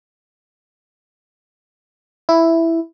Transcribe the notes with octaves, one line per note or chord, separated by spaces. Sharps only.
E4